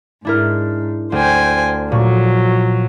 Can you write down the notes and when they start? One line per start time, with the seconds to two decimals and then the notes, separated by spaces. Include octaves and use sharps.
0.25 G#2 D4 E4 A#4
1.12 D2 C5 G5 G#5
1.92 A#2 F3 F#3 C#6